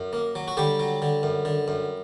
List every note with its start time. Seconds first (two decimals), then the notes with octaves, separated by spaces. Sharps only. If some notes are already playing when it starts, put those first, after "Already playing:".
Already playing: F#2
0.13 A#3
0.35 F#3
0.48 F#4
0.57 D3 G3 G4
0.80 F#3
1.02 D3
1.23 F#2
1.45 D3
1.68 F#2